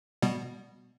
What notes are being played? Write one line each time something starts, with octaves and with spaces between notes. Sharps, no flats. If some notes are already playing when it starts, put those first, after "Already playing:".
B2 G3 B3